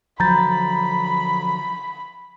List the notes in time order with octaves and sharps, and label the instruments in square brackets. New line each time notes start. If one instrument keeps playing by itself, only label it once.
[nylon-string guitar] D3 F3 F#3 [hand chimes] A#5 G6 A6 [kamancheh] B5